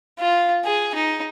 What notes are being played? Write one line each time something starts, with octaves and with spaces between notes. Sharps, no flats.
F4
G#4
D#4